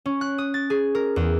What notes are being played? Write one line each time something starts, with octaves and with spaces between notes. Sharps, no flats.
C#4
F#6
D#6
A6
G#4
A#4
E2